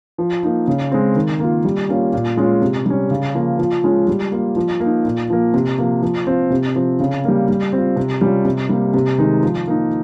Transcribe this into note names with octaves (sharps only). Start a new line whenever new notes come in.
F3
A#3 D#4
C#3
G#3 C4
D#3
A#3 F4
G3
A#3 C#4 F4
A#2
G#3 C#4 F4
C3
G3 C#4
C#3
F3 A#3 F4
F3
G#3 C#4 F4
G3
A#3 F4
F3
A#3
D#4
A#2
F3 A#3
C3
F3 A#3
F3
C4 F4
C3
F3 C4
C#3
G3 A#3
G3
C4 F4
C3
G3 C#4 F4
C3
G3 A#3
C3
D#3 G#3 D#4
F3
A#3 D#4